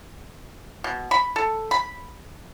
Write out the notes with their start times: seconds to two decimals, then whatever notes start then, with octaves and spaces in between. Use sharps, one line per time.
0.84 B2
1.11 B5
1.36 A4
1.71 B5